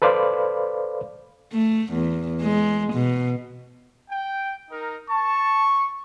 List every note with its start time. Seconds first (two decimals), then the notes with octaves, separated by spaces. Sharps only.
0.02 A4 B4 C5 D5 F5 B5
1.53 A3
1.93 E2
2.42 G#3
2.94 B2
4.09 G5
4.70 D#4 A#4
5.09 A5 C#6